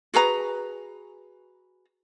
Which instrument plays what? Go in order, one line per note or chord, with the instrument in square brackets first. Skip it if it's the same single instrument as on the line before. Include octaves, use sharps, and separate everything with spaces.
[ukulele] F#4 G#4 B4 A#5